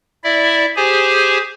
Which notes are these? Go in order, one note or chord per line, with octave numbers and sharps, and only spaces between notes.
E4 D5 E5
G4 G#4 C5 G#5